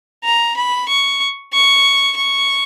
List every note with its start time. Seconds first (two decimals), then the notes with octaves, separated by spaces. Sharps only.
0.24 A#5
0.57 B5
0.89 C#6
1.53 C#6
2.17 C#6